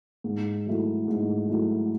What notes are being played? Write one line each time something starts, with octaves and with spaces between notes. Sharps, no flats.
G#2
F#3 A3 E4
G#2
F#3 A3 E4